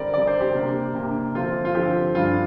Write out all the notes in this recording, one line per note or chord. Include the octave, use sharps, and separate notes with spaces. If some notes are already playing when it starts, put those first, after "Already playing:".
Already playing: D3 G3 C4 A#4 D5
D3 G3 C4 D5
C5
G4
C3 A#3 D4
C3 A#3 D4
D3 F3 C4 F4
F4
D3 F3 C4 G4
G2 G3 D4 F4